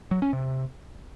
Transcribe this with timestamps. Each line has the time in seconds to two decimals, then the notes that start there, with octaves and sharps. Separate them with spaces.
0.11 F#3
0.22 C#4
0.33 C3